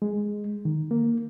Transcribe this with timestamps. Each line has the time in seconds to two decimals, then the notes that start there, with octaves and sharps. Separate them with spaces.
0.02 G#3
0.65 D#3
0.91 A#3